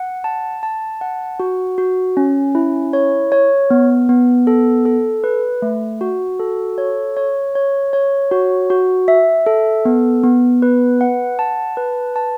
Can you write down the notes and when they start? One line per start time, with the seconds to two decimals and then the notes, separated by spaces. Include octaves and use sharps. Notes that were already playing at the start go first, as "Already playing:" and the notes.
Already playing: F#5
0.24 A5
0.63 A5
1.01 F#5
1.40 F#4
1.78 F#4
2.17 C#4
2.55 E4
2.93 C#5
3.32 C#5
3.70 B3
4.09 B3
4.47 A4
4.86 A4
5.24 B4
5.62 A3
6.01 F#4
6.39 A4
6.78 C#5
7.17 C#5
7.55 C#5
7.93 C#5
8.31 F#4
8.70 F#4
9.08 E5
9.46 A4
9.85 B3
10.24 B3
10.62 B4
11.01 F#5
11.39 A5
11.77 B4
12.16 A5